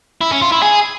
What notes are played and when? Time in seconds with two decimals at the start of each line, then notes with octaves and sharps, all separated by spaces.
0.21 E4
0.31 C#4
0.42 F4
0.52 E4
0.62 G#4